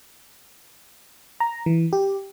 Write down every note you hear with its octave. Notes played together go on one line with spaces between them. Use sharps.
A#5
E3
G4